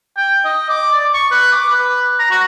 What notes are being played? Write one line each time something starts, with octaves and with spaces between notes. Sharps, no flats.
G5
D#5
D6
D5
C#6
B4
D6
B4
A#5
F#4